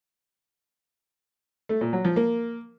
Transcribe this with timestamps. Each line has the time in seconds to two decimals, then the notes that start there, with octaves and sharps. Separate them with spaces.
1.69 A3
1.81 A#2
1.93 F#3
2.05 F3
2.16 A#3